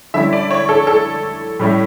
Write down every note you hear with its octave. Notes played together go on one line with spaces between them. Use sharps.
D3 G3 C#4 E4 E5
D5
C#5
A4
A4
A2 G3 C#4 E4